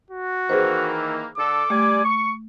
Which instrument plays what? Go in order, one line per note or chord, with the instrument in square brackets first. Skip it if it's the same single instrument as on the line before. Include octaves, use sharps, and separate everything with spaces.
[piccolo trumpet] F#4
[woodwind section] D#3 E3 A#3 [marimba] G#4 B4 C5
[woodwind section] D3 A4 [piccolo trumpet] D6
[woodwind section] G3 D5 G#5 [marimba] A3
[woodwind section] C#6